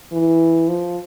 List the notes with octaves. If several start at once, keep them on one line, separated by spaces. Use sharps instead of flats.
E3
F3